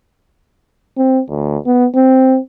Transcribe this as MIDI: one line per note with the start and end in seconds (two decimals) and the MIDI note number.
0.98 1.21 60
1.29 1.58 38
1.66 1.86 59
1.95 2.38 60